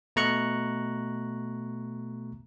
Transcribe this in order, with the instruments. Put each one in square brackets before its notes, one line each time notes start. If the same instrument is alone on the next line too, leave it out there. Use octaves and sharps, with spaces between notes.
[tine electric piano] B2 A3 A#5 C#6 F#6 C#7